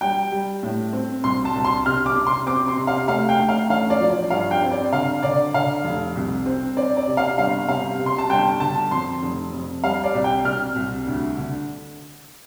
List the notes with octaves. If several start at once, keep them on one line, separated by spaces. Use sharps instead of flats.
G3 G5
G3
A2
C4
C2 C6
A5
C2
C6
C3 F6
D6
C3
C6
C4 D6
C6
C3
F5
A3 F5
G5
A3
F5
A1 F5
D5
F3
D5
G2 F5
G5
C4
D5
D3 F5
D3 D5
D3 F5
F1
C2
C4
C4 D5
D5
C3
F5
G1 F5
C3 F5
C3
C6
A5
G1 G5
D3 A5
F2 C6
F1
F2
G3 F5
D5
C2
G5
C2 F6
C2
D2
D3